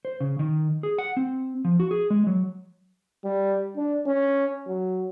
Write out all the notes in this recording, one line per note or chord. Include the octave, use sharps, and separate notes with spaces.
C5
C#3
D#3
G#4
F#5
C4
F3
F#4
G#4
G#3
F#3
G3
D4
C#4
F#3